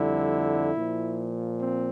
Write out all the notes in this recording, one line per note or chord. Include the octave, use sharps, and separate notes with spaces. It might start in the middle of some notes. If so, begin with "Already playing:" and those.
Already playing: F2 D3 G3 E4
A#2 F3
C4